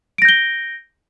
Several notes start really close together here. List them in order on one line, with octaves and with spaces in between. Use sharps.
D7 A#6 G6 G7